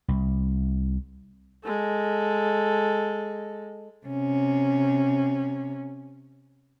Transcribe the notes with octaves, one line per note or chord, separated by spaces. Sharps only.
C2
G#3 A4
C3 C#4